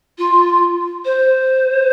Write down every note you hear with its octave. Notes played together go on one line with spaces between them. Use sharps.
F4
C5